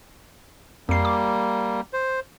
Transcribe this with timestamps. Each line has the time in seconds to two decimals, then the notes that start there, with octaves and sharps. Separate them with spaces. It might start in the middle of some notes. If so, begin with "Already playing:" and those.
0.89 F2 G3 A#3 C7
1.05 D6
1.93 C5